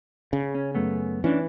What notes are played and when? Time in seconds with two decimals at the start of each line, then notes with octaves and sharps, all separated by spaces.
0.33 C#3
0.55 C#4
0.75 F#2 A3 B3
1.24 E3 C#4 D4